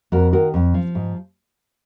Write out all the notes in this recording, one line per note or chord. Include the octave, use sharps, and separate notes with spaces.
F2 F#4 A#4
D#3 F#4 A#4
F2
F3
G#2